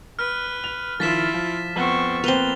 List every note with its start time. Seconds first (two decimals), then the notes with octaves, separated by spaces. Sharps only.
0.19 B4 F6
0.64 F7
1.00 D#3 F3 E4 F4 A6 B6 E7
1.34 F3
1.76 F2 B3 C4 F#5 C#6
2.24 A#3 C4 B4 F7 G7